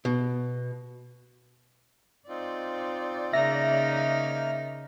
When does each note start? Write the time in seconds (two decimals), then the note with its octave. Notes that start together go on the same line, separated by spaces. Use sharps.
0.05 B2
2.28 C4 D#4 F4 D5
3.33 C#3 A#3 D#4 E5 F6 A#6